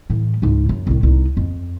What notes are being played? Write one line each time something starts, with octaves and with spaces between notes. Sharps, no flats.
A2 E3
C#2 G#2
F#2
C2 A2
C2 D#4
F2